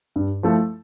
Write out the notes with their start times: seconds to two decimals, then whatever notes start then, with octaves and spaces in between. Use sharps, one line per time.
0.16 G2
0.43 F3 A3 E4 A4